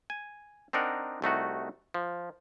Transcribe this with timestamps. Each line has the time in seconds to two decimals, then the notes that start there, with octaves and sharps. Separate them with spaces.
0.10 G#5
0.73 C4 D4 D#4 A#4 F#5
1.22 C2 A3 D#4 F#4
1.94 F3